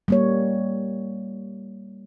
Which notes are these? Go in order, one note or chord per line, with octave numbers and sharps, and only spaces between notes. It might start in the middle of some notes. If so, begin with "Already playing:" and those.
G3 A#3 C#5